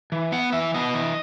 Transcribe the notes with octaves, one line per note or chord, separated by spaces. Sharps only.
E3
B3 F#5
E3 E5
B3 D#5
E3